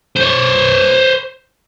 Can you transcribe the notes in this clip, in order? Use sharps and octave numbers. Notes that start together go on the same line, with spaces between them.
C5 C#5